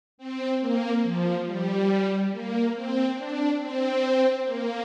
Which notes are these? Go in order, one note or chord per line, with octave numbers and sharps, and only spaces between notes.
C4
A#3
F3
G3
A#3
C4
D4
C4
A#3